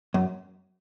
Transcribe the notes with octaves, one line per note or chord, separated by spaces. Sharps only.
F#2